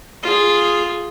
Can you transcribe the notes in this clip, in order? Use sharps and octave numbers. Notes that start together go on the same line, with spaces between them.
F4 G#4